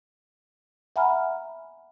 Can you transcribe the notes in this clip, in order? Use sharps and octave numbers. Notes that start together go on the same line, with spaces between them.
E5 F#5 G#5 A#5 B5 F6